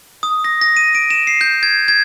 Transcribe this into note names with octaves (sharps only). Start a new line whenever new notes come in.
D#6
A#6
A#6
D#7
D7
E7
C7
G6
G#6
G#6